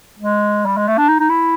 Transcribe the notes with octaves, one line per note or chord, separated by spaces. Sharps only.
G#3
G3
G#3
A3
D4
D#4
D#4
E4